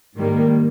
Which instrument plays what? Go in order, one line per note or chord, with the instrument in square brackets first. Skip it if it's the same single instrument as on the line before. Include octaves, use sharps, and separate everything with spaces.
[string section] G#2 D#3 G3 A#3